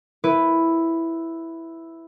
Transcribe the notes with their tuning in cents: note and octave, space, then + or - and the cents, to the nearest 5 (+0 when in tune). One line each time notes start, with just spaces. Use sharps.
E4 +0 B4 +5